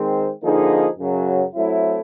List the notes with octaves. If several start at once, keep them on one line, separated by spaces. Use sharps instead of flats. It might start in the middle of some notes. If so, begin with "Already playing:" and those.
Already playing: D#3 G#3 C4
D3 F3 A#3 D#4 G#4
F#2 C#3 F#3
F#3 A3 C4 E4